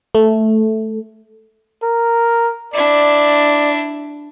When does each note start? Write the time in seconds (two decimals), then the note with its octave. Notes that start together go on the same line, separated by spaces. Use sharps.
0.15 A3
1.83 A#4
2.74 D4 E4 D5